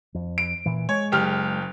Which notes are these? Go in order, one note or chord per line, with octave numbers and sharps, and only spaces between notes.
F2
D7
A#2 E3
G#3 C#5
F#1 G4 F6